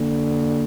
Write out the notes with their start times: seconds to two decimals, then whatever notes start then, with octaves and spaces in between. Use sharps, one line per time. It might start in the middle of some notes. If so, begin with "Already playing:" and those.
Already playing: D3 A#3
0.30 A#3